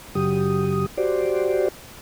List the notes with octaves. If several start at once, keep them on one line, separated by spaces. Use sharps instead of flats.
F#2 C#3 F#3 G4 D#6
F#4 G4 C5 D5